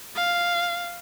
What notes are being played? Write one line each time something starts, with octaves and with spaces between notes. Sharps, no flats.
F5